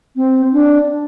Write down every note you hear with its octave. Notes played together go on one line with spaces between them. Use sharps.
C4
D4